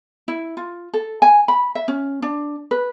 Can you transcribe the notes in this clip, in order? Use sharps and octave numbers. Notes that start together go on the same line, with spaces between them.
E4
F4
A4
G#5
B5
E5
C#4
D4
B4